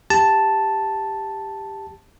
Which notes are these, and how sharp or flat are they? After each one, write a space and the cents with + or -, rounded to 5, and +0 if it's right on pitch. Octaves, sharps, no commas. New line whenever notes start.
G4 +10 A5 +0